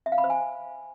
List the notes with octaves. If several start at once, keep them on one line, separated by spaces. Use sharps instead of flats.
E5
F5
B5
C5
G#5